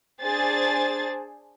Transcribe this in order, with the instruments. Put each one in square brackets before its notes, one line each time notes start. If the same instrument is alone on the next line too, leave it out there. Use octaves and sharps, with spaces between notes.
[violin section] D4 G#4 C5 A6